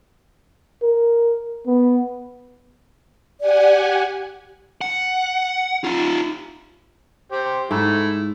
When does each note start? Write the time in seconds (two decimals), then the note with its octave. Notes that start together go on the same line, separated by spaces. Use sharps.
0.82 A#4
1.67 B3
3.41 G4 D5 F#5 G#5
4.81 F#5
5.84 D#4 F4
7.32 G4 C5
7.71 G#2 A3 E4